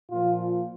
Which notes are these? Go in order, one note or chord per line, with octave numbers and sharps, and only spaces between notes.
A#2 F3 F4